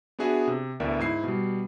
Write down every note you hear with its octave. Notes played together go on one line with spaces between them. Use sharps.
B3 D4 F#4 G#4 E5
C3
D2 A2 B3 A#4 D5 E5
G#2 E4 C7
B2 G3